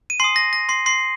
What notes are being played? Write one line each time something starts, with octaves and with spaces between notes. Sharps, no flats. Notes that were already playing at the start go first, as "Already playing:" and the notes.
D#7
G#5 C6 D#6 C7
A#6
A#6
C6 C7
C6 C7